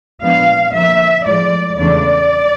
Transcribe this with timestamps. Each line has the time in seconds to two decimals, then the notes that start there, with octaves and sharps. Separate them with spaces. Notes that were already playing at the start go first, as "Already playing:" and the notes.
0.22 A#2 F3 G#3 B3 D4 F5
0.74 D3 F3 A#3 E5
1.26 A2 F3 G#3 D5
1.78 E2 C#3 E3 A3 D4 D5